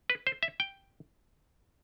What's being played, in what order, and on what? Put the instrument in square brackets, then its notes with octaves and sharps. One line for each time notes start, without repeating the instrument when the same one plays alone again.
[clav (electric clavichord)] B4
C5
E5
G5